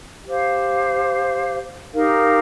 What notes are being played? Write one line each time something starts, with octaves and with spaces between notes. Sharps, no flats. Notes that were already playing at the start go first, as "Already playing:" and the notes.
G4 C5 F5
D#4 G4 A#4 F5